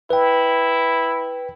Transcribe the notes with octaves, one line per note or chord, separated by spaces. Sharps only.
E4 B4 G5